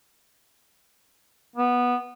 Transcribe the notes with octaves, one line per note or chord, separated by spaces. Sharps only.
B3